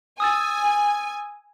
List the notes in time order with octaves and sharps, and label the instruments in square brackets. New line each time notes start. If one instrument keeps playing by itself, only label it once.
[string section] G#5 [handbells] D#6 E6 A6